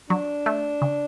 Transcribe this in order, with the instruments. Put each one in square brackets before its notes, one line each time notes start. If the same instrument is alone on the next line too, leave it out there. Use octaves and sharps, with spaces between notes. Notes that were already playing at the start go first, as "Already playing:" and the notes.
[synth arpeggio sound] F#3 [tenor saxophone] D4
[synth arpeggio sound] A3
C#3